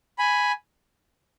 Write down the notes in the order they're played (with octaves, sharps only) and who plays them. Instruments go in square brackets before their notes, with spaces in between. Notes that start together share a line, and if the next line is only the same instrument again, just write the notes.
[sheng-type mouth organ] G#5 B5